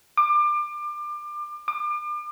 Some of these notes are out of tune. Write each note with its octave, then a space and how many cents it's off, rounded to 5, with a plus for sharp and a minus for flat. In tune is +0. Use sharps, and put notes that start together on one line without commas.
D6 +30
D6 +35